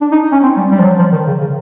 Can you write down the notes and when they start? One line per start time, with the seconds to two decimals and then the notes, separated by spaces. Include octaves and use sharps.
0.01 D4
0.11 D#4
0.32 C#4
0.43 C4
0.57 G3
0.71 G3
0.79 F3
0.84 F#3
0.99 F3
1.12 D#3
1.27 C#3
1.41 C#3